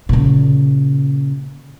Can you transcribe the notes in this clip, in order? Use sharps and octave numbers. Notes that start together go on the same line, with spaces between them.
A#2 C#3